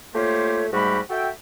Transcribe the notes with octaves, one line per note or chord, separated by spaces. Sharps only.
A3 A#3 F4 G4 C5 C#5
G#2 G3 A3 F#4 G4 B5
F#4 A4 E5 G5